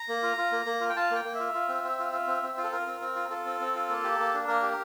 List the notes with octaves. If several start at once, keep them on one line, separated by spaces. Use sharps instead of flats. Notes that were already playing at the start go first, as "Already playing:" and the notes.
Already playing: A#5
A#3
F4
F4
A#3
A#3
F4
G5
F4 A5
A#3 G5
A#3
F4 E5
F4
C4
C4
F4
F4
C4
C4
F4
A4
F4 A#4
C4
C4
F4
F4 A4
C4
C4
F4
A#3
G4
A#3
D4
A#3 A#4
G4